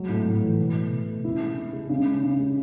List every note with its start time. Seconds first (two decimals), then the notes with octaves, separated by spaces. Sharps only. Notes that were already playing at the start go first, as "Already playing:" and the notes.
Already playing: F#3 G#3
0.09 A2
0.25 A2
0.42 E3
0.59 B2
0.74 A3
0.91 B2
1.08 A3
1.24 C#3 E4
1.40 G#3
1.57 C#3
1.73 G#3
1.89 C#3
2.06 G#3
2.23 C#3
2.39 G#3